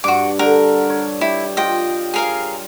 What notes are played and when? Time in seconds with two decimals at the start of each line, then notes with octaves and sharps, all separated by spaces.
0.04 G2 F#4 D6
0.39 D3 A#4
0.90 C#5
1.21 E4 G4
1.57 F4 D#5 G5
2.14 G#4 A#4 F5